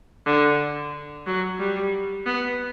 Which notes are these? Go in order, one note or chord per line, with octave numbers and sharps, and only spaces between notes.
D3
F#3
G3
B3